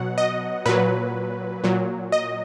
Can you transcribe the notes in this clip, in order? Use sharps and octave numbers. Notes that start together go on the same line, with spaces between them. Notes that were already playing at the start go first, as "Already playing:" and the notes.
Already playing: B2 F#3 F#5
D#5
A#2 F#3 B4
A#2 F#3
D#5